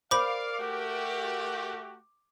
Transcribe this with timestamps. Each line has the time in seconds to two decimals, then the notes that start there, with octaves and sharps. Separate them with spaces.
0.11 A#4 C5 D5 F5 B5 D6
0.59 A3 F#4 G4